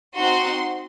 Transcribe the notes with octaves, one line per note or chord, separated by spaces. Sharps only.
C4 D#4 F#4 C6